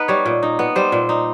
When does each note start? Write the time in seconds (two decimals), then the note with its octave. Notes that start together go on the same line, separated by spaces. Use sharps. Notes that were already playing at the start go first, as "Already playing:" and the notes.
Already playing: B3 D#4 B4
0.08 G3 C#5
0.25 A#2
0.43 D#4
0.59 B3
0.76 G3 C5
0.92 A#2
1.09 D#4